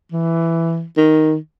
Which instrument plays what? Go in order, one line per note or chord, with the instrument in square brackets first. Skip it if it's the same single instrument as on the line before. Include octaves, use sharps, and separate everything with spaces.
[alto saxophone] E3
D#3